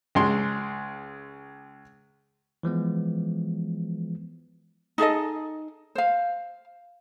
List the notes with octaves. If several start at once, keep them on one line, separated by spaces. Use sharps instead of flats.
C#2 G#3 C6
E3 F3 G#3 B3
D#4 G#4 A4 D#5
C5 F5